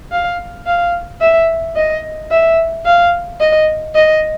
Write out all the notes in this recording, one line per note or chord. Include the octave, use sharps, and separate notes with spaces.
F5
F5
E5
D#5
E5
F5
D#5
D#5